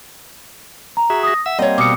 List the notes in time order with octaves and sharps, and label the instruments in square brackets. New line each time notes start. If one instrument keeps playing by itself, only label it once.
[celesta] A#5
[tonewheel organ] F#4 G#4 E5
[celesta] D#6 A#6
[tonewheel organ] E5 E6 [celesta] F#5
[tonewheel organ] G3 A#3 C4 [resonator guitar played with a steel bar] C#5 D#5
[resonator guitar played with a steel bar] B2 [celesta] D6 D#6 C#7